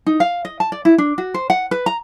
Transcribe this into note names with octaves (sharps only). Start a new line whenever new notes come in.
D#4
F5
D#5
A5
D5
E4
D4
F#4
C5
F#5
B4
A#5